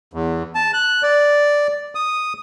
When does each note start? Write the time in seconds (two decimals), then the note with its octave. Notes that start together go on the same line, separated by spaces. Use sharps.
0.14 E2
0.55 A5
0.74 F#6
1.03 D5
1.95 D#6